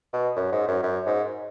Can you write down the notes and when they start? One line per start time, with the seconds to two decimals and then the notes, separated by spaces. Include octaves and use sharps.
0.13 B2
0.36 F#2
0.52 G#2
0.68 F#2
0.83 F#2
1.06 G#2